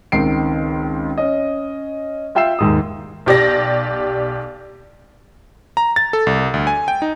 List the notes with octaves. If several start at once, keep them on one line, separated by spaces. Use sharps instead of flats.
C#2 D#3 C4 C7 D7
C#4 D#5
F4 E5 G5 E6 C7 E7
D#2 G#2 D#6
B1 G4 D5 A#6
A#5
A6
A4
C2
D2
G#5
G5
D#4